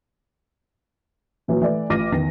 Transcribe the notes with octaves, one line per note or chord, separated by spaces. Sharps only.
A#2 E3 F#3
E3 A3 D5
A1 F4 D6 F6 A#6 D#7
E2 D#3 A#6